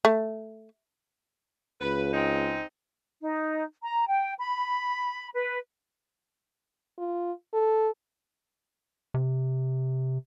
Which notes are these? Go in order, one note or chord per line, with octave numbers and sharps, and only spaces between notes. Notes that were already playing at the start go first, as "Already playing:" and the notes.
A3
C#2 B4
G#3 C4 D#4
D#4
A#5
G5
B5
B4
F4
A4
C3